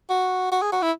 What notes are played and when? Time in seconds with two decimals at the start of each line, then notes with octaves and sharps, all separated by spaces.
0.10 F#4
0.52 F#4
0.62 G#4
0.72 F#4
0.82 E4